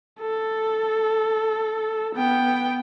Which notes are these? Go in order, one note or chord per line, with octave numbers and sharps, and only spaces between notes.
A4
B3 G5